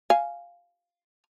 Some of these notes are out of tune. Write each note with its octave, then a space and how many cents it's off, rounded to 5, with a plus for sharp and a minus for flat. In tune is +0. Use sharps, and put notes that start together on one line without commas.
F5 +0 G#5 +5